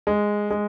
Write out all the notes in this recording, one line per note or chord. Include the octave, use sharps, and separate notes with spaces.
G#3
G#3